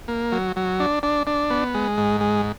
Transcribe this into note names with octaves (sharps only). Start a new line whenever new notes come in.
A#3
F#3
F#3
D4
D4
D4
B3
G#3
G#2
G#3